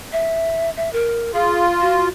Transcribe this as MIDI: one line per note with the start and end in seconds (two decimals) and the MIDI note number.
0.12 0.70 76
0.77 0.90 76
0.93 1.34 70
1.34 2.09 65
1.34 1.63 68
1.81 2.09 66